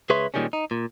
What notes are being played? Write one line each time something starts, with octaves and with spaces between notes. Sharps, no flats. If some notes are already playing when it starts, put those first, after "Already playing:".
C#2 G#4 B4 C#5 E5 C6
A#2 D3 D#3 G3 G#3 C#4
D#4
A#2